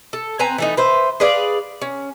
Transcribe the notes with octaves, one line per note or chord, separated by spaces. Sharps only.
A4
C4 B4 G#5 A#5
E3 A3 D#4
B4 C5 E5
G#4 B4 D5 F5
C#4